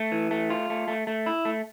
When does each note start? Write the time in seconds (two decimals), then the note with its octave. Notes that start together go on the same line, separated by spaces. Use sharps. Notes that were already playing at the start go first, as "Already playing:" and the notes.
Already playing: A3
0.12 E3
0.31 A3
0.50 F4
0.70 A3
0.88 A3
1.07 A3
1.26 E4
1.45 A3